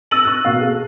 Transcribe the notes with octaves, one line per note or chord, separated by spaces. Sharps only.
E6 A6 A#6 D#7 F#7
C#6 F#6
B2 A#3 F5
G#4 A4